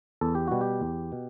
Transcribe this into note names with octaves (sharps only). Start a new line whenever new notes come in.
E2 A4
G4
B2 G3 F#4
G4
E2
B2